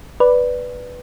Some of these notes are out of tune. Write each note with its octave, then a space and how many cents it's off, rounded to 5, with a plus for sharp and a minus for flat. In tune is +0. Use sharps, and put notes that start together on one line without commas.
B4 +0 D5 +0